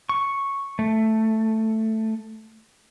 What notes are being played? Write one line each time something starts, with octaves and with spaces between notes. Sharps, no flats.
C#6
A3